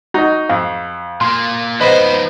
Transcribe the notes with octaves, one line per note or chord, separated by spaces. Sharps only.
D#4 F#4 D#5
F2 F5
A#2 A#3 C6
F3 B3 D#4 B4 C5 D#5 B5